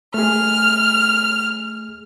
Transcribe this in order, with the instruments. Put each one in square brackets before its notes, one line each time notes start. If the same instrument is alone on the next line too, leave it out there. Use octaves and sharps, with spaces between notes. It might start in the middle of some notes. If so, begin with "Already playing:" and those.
[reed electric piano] A3 G#4 [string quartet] F6